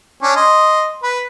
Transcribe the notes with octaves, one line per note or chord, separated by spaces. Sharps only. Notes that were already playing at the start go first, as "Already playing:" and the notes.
C#4 D4
D#5 C6
B4